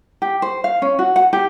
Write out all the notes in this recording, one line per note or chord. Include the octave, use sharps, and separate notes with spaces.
G4
C5
F5
C#4
F#4
F#5
G4